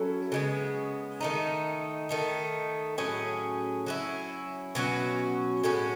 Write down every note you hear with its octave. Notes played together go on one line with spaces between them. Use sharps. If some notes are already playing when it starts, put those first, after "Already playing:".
Already playing: F#3 C#4 E4 A4
C#3 G#3 B3
D#3 A3 D#4
D#3 A3 D#4
A2 F#3 C#4 G#4
F#3 C#4 E4
B2 F#3 C#4 F#4
A2 G#3 C#4 F#4